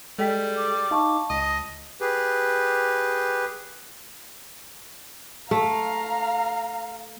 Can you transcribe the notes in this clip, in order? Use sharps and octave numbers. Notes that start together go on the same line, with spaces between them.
G3 G#3 A4 G5 B6
D6
D#4 F5 A5 C#6
C#2 D#5 A5 A#6
G4 G#4 B4
A3 F5 A#5